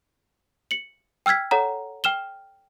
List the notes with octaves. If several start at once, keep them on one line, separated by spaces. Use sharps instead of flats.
C#7 F#7
G5 E6 F6 G#6 B6
A4 C#5 F#5 A#5
G5 F6 E7 G7